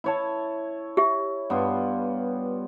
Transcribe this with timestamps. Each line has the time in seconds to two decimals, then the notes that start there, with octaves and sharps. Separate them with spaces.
0.04 E4 C#5 A5
0.97 G4 E5
1.50 G2 B3 F4